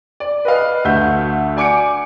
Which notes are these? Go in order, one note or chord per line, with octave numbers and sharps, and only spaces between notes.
D5
B4 D#5 F5
D2 A3 E5 G6
D5 G#5 D6 C#7 D7